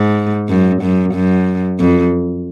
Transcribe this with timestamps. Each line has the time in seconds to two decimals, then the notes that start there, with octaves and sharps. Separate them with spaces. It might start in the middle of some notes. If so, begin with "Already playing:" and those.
Already playing: G#2
0.49 F#2
0.82 F#2
1.14 F#2
1.80 F2